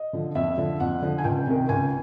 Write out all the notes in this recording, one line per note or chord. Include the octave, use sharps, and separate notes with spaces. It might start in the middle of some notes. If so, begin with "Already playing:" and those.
Already playing: D#5
D3 F3
F2 E5
D3 F3
F2 F#5
D3 F3
G#5
C#2 G5
C3 D#3
C#2 G#5